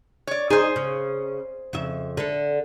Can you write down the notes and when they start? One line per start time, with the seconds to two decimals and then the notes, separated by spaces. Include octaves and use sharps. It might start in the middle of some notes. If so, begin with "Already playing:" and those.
0.27 C#5 D5
0.50 D#4 G#4 C5
0.76 C#3
1.73 F2 C#3 E5
2.17 D3 A4